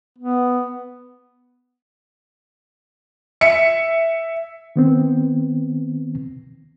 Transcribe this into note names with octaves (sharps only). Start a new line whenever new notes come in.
B3
E5 C#7
D#3 B3 C4